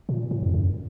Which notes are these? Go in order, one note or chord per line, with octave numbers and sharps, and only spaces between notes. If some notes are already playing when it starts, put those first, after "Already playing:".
A#2
A2
F2
F#2